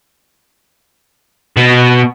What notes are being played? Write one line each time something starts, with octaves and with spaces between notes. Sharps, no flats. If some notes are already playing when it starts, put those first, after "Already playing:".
B2